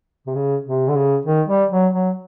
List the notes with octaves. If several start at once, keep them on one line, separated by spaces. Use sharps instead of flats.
C3
C#3
C3
D3
C#3
D#3
G3
F#3
F#3